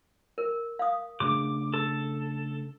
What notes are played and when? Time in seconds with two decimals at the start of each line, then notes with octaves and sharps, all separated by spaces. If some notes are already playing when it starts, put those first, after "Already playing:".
0.38 A#4
0.79 F5 D#6
1.20 C#3 A3 D4 G#4 D6
1.74 A4